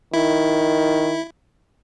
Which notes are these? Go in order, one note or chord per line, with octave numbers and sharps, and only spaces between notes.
D#3 E4